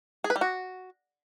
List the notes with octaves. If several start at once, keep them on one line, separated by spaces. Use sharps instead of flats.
G#4
B4
G3
F#4